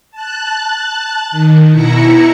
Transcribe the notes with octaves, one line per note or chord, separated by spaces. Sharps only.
A5 F#6
D#3
B2 E4 A#5 C#7